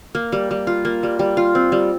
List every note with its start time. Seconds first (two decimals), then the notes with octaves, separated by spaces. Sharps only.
0.15 A#3
0.32 G3
0.51 G3
0.67 F4
0.85 A#3
1.03 G3
1.19 G3
1.37 F4
1.55 C4
1.72 G3